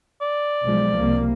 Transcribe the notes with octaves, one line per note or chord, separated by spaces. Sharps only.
D5
B1 F3 G#3
C2 A#3